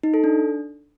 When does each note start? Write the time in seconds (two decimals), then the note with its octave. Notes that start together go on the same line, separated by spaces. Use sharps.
0.03 D#4
0.14 A4
0.24 D4